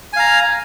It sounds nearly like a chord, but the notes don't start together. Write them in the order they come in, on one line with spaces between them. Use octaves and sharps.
G#5 F5 A#5